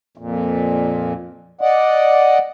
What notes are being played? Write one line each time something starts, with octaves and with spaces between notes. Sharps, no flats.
F2 A#2
D5 D#5 F#5